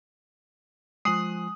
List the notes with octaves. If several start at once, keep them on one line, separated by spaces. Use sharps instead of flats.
F3 G#3 G#5 D#6 C7 F#7